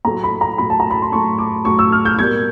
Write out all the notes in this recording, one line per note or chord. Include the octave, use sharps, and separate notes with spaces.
A2 F#3 A3 A#5
B5
A#5
A2 F#3 A3 B5
A5
A#5
B5
C6
A2 F#3 A3 C#6
D6
A2 F#3 A3 C#6
E6
F6
G6
B2 G3 A#3 G#6